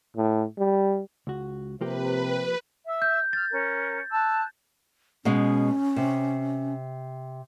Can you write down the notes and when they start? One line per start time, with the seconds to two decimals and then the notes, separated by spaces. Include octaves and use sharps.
0.16 A2
0.58 G3
1.27 C#2 F#4
1.81 C3 F3 A#3 G4 B4
2.87 E5 E6
3.02 G6
3.33 F6 A6
3.51 C#4 A#4
4.11 A5 E6 F#6
5.25 B2 G#3 C#4
5.96 C3